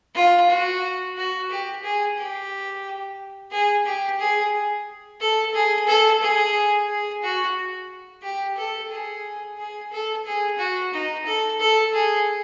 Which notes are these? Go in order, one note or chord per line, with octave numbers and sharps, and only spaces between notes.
F4
F#4
F#4
G4
G#4
G4
G#4
G4
G#4
A4
G#4
A4
G#4
G#4
F#4
G4
A4
G#4
G#4
A4
G#4
F#4
D#4
A4
A4
G#4